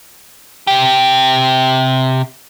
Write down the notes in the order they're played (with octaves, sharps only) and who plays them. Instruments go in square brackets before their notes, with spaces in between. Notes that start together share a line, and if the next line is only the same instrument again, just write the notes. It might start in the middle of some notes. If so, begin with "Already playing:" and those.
[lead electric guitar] C3 G4